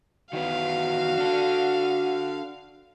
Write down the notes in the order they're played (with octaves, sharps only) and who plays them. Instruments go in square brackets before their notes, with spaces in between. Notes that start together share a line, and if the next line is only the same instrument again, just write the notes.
[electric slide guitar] D#3 E3 B3 [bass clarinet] F#4 [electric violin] F5
[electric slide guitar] D4 A4